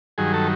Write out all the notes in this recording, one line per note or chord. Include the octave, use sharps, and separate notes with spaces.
G2 D#3 F#3 G#4
A4